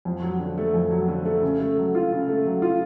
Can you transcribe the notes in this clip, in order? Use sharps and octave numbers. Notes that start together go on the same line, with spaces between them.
F2
F#3
D3
A3
F2
F#3
D3
A3
C#3
A3
F#3
F4
C#3
A3
F#3
F4